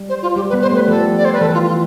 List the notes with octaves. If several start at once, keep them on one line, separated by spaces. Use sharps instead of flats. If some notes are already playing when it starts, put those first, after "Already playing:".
Already playing: G3
C5
F4
G3 G4
B4
G3 B3
C5
G3
A3 B4
F3 A4
D5
C5
B4
E3 A4
F4
F4